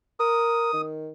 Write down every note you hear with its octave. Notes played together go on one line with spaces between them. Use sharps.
A#4 D#6
D#3